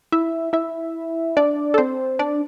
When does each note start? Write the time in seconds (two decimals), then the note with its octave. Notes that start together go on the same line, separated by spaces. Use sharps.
0.12 E4 E5
0.53 E4 E5
1.37 D4 D5
1.74 A4
1.78 C4 C5
2.19 D4 D5